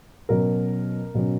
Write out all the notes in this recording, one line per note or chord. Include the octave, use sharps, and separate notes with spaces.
B2 F#3 C#4 A#4
B2 F#3 C#4